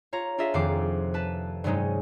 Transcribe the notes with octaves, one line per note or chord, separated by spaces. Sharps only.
F4 C#5 A#5
D4 F4 G#4 D#5 E5
F1 F2 D#3 C4 D6 C7
B4 A5
G2 C3 F#3 G#3 C#4 D#4